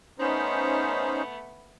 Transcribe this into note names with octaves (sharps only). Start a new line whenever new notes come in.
A3 B3 C#4 D#4 C5